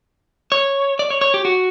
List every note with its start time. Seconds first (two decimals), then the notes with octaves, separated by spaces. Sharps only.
0.52 C#5
0.99 D5
1.10 C#5
1.21 C#5
1.34 G4
1.45 F#4